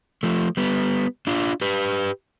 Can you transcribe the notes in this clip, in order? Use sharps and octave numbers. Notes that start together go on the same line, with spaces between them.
F3 A3
G3 B3
D4 F4
G4 B4